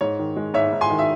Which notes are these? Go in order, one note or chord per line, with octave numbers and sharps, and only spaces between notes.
G#2 C#5
D#3
G#3
G#2 C#5 E5
G#2
G#5 C6
D#3
E5